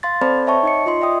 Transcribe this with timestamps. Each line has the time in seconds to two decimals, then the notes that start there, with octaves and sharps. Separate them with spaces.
0.03 F5 C6 A6
0.21 C4 A4 C5 D5 A5 B5
0.47 C#5 E5 G5 A5 C#6
0.63 D#4 D#5 C#7
0.86 F4 D#5 C6
1.01 D5 E5 G5 D#6